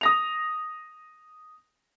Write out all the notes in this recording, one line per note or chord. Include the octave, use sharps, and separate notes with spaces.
D#6 A#6 F7